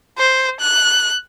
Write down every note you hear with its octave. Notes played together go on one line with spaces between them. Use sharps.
C5
F#6